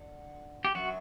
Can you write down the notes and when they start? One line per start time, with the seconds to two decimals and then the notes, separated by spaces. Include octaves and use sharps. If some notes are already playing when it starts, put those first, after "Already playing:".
Already playing: D3
0.65 G4
0.75 F#2 F#3 F#4